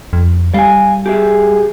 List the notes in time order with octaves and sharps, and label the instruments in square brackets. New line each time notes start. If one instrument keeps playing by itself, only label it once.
[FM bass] F2
[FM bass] G3 [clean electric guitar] F5 G#5
[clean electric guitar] G4 G#4 E5